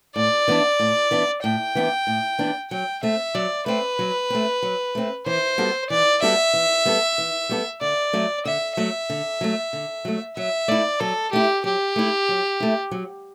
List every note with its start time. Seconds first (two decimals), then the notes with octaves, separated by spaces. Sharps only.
0.16 A2 D5
0.48 E3 B3 D4
0.79 A2
1.11 E3 B3 D4
1.43 A2 G5
1.75 E3 B3 D4
2.07 A2
2.39 E3 B3 D4
2.71 F#3 G5
3.03 A3 C4 E5
3.35 F#3 D5
3.66 A3 C4 B4
3.99 F#3
4.30 A3 C4
4.62 F#3
4.95 A3 C4
5.26 E3 C5
5.58 G3 B3 F#4 A4
5.90 E3 D5
6.22 G3 B3 F#4 A4 E5
6.53 E3
6.85 G3 B3 F#4 A4
7.18 E3
7.49 G3 B3 F#4 A4
7.81 D3 D5
8.13 F#3 A3
8.45 D3 E5
8.77 F#3 A3 E5
9.10 D3
9.41 F#3 A3
9.73 D3
10.05 F#3 A3
10.37 F#3 E5
10.68 A3 E4 D5
11.00 F#3 A4
11.32 A3 E4 G4
11.64 F#3 G4
11.96 A3 E4
12.29 F#3
12.60 A3 E4
12.91 F#3